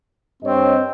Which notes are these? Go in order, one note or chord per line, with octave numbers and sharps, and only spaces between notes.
G2 C4 C#5 D#5